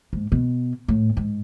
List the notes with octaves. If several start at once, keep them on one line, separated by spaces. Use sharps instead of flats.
G#2
B2
A2
G#2